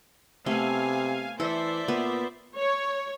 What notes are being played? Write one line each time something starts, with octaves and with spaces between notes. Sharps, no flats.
C3 A3 B3 F5 G#5
E3 A4 C5 D5 E5
A#2 B3
C#5